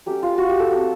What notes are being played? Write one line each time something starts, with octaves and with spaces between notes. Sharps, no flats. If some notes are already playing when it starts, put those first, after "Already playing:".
F#3 A3 C#4 G4
F4
F#4
G4
A4
F#3 A3 C4 F#4